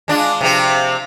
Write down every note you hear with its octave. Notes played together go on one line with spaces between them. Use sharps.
G#3 D4 F4
C3 F3 C4